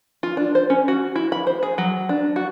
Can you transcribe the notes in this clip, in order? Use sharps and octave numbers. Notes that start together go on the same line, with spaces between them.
F4
D4
C5
C#4
F#4
E4
B5
C5
G#4
F#3
D4
F#4